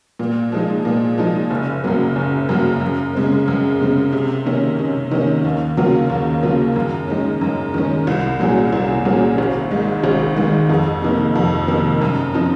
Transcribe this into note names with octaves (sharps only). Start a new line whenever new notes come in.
A#2
F3 G#3 D#4
A#2
F3 G#3 D#4
F#1
F#2 C#3 F#3 A#3
F#1
F#2 C#3 F#3 A#3
F#2
C#3 G#3 C4
F#2
C#3 G#3 C4
C3
D#3 A#3 C#4
C3
D#3 A#3 C#4
D#2
C#3 F#3 A#3 F4
D#2
C#3 F#3 A#3 F4
F#2
D#3 G#3 C#4
F#2
D#3 G#3 C#4
C2
A#2 F#3 C#4 G#4
C2
A#2 F#3 C#4 G#4
G#1
G#2 D#3 G#3
G#1
G#2 D#3 G#3
F2
C3 D#3 A#3
F2
C3 D#3 A#3
F#2
F3 C4 D#4